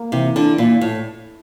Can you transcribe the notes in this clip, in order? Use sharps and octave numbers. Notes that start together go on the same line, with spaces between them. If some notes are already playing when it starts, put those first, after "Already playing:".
Already playing: A#3
C3 E3
D3 E4
A#2 E4
A2 E4